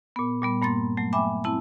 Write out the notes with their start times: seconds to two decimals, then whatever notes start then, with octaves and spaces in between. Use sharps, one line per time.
0.16 A#2 B3
0.42 A#2 G3 B3
0.62 G2 A#3 C6 A6
0.97 F#3 A3
1.13 E5 G5 G#5 B5 D6
1.44 C4 E4 A5